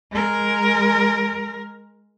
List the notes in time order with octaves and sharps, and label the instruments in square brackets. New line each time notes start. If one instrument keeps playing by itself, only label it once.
[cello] G#3 A#4